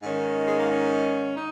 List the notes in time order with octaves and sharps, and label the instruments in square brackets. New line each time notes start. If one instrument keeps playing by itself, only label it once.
[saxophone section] G#2 D#3 C#4
G#3
A#3
C#4
D#4